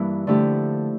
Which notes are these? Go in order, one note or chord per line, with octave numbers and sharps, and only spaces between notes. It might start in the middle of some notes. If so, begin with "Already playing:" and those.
Already playing: G2 E3 G3 A#3 E4
D3 F3 A3 E4 G4